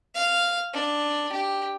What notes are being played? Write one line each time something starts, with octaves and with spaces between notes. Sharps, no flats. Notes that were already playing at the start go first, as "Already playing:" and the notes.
F5
D4
G4